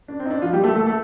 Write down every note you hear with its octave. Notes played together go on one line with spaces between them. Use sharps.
D4
C4
D#4
D4
F3 F4
G3 G4
A3 A4
A3 A4
A3 A4